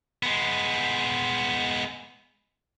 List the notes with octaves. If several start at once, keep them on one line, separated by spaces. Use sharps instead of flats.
G#3 B3